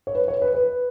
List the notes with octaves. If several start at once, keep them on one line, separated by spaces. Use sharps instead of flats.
C#5
B4
C#5
B4
B4